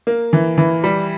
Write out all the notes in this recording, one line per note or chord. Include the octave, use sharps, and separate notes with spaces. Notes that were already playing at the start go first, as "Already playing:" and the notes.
A#3
E3
E3
G3